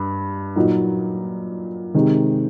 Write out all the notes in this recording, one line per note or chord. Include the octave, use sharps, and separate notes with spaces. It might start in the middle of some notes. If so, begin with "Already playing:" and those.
Already playing: G2
A#2 F#3 A#3 D#4
C3 D#3 G#3